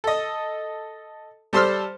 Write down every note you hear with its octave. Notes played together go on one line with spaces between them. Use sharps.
A4 D#5
G3 A4 C5 C6 E6 F6